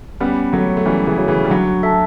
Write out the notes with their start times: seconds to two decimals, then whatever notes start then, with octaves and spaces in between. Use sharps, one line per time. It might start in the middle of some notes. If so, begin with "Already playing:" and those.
0.20 G3 B3 C#4
0.53 F#3 A3 F#4 C#5
0.77 A3
0.85 E3 G3 C#4
1.07 C#3 E3
1.18 F#4 C#5
1.28 C#3 E3
1.44 G3
1.50 D3 F#3 F#4
1.83 A4 E5 A5